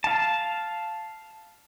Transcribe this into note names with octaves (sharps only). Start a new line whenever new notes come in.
F5 A5